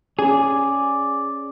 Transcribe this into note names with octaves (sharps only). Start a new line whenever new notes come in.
C#4 G#4 D5